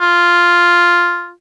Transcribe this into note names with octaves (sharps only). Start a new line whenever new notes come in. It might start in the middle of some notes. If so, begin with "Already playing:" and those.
F4